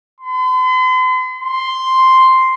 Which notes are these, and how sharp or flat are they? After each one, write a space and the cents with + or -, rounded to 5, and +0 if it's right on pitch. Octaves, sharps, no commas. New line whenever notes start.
C6 -45
C6 +0